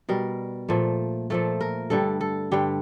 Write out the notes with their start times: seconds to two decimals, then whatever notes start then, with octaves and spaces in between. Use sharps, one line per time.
0.09 B2 G3 A#4
0.69 A#2 F3 A3
1.30 A#2 F3 A3 A4
1.61 A#4
1.90 G2 D3 G3 A4
2.21 A4
2.52 G2 D3 G3 G4